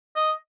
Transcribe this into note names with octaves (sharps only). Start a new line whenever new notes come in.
D#5